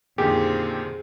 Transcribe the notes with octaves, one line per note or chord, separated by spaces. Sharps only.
F2 A#2 D3 D#3 C4 G4 G#4